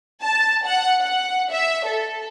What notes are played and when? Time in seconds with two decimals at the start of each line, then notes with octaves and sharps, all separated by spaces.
0.22 A5
0.65 F#5
1.01 F#5
1.52 E5
1.86 A4